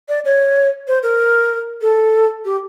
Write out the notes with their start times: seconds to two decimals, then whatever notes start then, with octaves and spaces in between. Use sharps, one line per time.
0.09 D5
0.25 C#5
0.88 C5
1.03 A#4
1.82 A4
2.45 G4